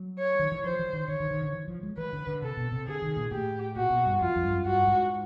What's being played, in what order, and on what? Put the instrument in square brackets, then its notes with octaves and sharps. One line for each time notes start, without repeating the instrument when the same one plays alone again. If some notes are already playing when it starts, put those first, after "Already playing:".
Already playing: [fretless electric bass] F#3
[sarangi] C#5
[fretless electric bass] D#3
E3
[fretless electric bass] F3 [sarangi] C5
[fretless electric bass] E3
D#3
[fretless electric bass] D#3 [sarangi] C#5
[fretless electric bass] D#3
D#3
D3
E3
F3
G#3
[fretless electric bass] E3 [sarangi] B4
[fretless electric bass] D3
D3
[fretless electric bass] C3 [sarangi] A4
[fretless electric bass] B2
C3
[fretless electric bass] D3 [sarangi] G#4
[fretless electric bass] D#3
A#2
[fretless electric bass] A2 [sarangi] G4
[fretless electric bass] A#2 [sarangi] F#4
[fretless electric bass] B2
G2
[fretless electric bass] F2 [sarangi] F4
[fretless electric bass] F2
G2
F#2
[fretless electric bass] G2 [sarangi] F#4
[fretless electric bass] G#2